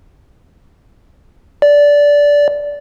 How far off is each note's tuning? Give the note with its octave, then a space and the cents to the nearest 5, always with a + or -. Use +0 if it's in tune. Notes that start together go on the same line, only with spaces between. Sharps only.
D5 -15